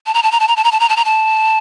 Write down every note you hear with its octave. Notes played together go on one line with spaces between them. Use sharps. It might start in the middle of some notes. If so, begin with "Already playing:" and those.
A5
A#5
A5
A#5
A5
A#5
A5
A#5
A5
A#5
A5
A#5
A5